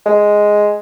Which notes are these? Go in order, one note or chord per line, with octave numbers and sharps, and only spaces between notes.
G#3